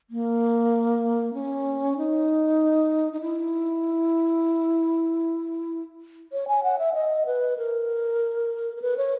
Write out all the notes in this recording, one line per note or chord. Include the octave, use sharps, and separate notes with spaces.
A#3
C#4
D#4
D#4
E4
C#5
G#5
F#5
E5
D#5
B4
A#4
A#4
B4
C#5